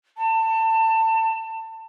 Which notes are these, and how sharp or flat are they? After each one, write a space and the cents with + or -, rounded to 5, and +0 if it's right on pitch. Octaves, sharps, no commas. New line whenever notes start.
A5 +25